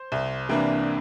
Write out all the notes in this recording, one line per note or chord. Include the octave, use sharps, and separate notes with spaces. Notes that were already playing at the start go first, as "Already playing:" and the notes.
Already playing: C5
C2
C3 E3 A#3 D4